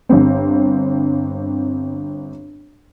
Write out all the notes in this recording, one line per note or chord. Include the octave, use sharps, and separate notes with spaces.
G1 C4